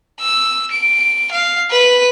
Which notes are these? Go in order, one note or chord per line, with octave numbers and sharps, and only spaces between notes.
E6
D7
F5
B4